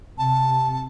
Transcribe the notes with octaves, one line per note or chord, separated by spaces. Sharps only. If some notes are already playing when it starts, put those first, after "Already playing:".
C3 A5